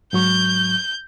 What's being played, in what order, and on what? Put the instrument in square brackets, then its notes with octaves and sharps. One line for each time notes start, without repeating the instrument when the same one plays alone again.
[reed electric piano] G#2 F#3 C#6 [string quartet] G6